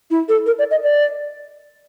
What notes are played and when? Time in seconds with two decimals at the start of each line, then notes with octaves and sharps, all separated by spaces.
0.11 E4
0.29 A4
0.46 A#4
0.59 D5
0.71 D#5
0.83 D5